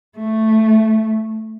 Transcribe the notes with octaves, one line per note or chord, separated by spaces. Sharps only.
A3